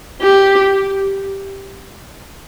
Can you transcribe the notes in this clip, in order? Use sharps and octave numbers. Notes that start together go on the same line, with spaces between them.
G4